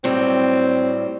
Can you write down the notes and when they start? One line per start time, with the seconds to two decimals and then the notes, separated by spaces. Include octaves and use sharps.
0.04 A2 F#3 G3 C4